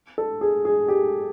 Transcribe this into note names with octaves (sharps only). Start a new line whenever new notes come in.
A4
G#4
G#4
G4